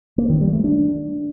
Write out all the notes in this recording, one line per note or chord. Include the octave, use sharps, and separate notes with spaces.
A#3
D#3
G3
A3
D4